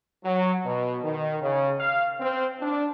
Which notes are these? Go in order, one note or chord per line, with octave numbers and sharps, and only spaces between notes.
F#3
B2
D#3
C#3
F5
C4
D4